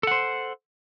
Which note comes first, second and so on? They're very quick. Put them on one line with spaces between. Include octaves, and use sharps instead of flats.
A4 F#5 C5